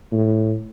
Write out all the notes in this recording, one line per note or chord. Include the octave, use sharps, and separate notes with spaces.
A2